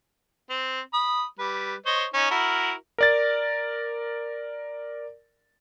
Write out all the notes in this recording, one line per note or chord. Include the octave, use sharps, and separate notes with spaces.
C4
B5 D#6
G3 B4
C5 C#5 D#5
C#4 D#4
E4 F#4 A#4
A#4 D5 A6